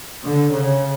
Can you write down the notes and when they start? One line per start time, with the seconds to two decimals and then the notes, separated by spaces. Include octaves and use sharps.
0.23 D3
0.51 C#3